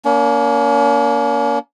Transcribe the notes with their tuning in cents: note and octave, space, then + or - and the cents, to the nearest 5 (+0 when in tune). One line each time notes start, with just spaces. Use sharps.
A#3 +5 C#4 +40